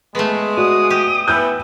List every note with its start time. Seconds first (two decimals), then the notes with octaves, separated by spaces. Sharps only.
0.15 G#3 A3 B3
0.57 F#4 D5 D#6
0.90 G4
1.28 E3 B3 B4 E6 G6